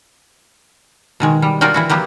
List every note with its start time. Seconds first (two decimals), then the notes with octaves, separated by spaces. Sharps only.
1.20 B2 D#3 G#3
1.42 G3
1.61 F4 F#4 A#4 D5 G5
1.74 E3 E4 F#4
1.90 F#3 A#3 B3 G4